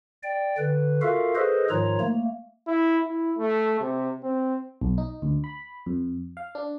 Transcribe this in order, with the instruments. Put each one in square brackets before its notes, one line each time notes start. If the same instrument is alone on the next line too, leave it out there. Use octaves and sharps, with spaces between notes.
[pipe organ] D5 G5
D3 B4
F4 F#4 A4 A#4 E5 F5
G#4 A4 B4 C5 D#5
G#2 D#3 F3 F4 C#5 A#5
A3 A#3
[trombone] E4
E4
A3
C3
C4
[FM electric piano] B1
D#4
D2
B5
F2
F5
D4